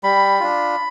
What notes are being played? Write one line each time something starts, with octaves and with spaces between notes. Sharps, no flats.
G3 B5
D4 F4